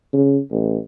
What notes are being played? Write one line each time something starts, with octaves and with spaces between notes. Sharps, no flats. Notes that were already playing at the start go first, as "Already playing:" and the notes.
C#3
A1